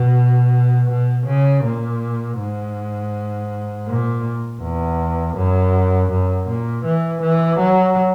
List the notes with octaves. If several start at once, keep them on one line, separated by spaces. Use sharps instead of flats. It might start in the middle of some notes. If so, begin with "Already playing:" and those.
Already playing: B2
B2
C#3
A#2
G#2
A#2
E2
F#2
F#2
A#2
E3
E3
F#3